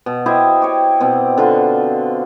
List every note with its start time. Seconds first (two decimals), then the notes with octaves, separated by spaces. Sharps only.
0.06 B2
0.26 E4 G4 C5 D#5
0.62 G4 C#5
1.00 B2 C4
1.37 D3 F4 F#4